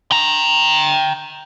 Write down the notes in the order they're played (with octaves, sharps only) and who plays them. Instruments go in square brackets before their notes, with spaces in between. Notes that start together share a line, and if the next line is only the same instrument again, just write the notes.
[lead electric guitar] G5 A#5